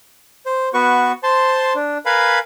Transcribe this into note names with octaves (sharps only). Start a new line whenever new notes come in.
C5
B3 F#4 B4 C#6
C5 A5 C6
D4
A#4 B4 F5 G#5 B5